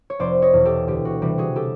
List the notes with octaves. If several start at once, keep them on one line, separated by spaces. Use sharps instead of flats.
C#5
F1 C5 D5
C#5 D#5
E2 B2
G4 A4
D2 G4
F#4
C3 E3 G3 G4
F#4 G#4
G4 A4